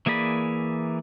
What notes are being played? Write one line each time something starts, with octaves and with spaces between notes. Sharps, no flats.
E3 A#3 G#4 D5 B5